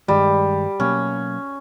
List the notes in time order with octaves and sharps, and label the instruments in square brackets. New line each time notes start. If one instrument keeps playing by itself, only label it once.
[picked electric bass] G2 D#3 G#3 [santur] G3
[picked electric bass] B2 F#3 A#3 [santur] C#4